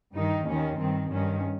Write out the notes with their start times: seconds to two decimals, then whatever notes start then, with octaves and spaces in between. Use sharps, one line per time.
0.13 G2 D#3 D#4
0.46 D#2 D#3 C#4
0.78 G2 D#3 C4
1.11 G2 D#3 C#4